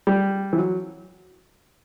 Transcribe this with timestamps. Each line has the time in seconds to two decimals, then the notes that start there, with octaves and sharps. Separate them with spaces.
0.07 G3
0.53 E3
0.58 F#3